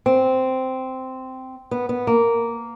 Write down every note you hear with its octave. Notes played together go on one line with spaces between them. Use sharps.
C4
B3
B3
A#3